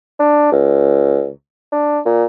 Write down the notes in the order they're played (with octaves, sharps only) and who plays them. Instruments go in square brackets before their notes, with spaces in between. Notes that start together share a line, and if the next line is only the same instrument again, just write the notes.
[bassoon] D4
C#2
D4
A#2